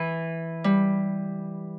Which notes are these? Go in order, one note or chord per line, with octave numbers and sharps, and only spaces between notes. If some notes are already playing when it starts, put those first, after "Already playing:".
Already playing: E3
G3